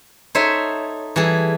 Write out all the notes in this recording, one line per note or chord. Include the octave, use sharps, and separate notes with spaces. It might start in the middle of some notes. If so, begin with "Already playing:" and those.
D#4 A4 C5 C#5 E5
E3 G3 G#4 A4